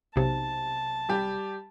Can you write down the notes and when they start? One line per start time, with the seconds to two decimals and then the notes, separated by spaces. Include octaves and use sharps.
0.16 B1 C3 A5
1.09 G3 G4